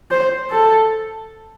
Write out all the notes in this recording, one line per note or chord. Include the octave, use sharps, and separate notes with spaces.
C5
A4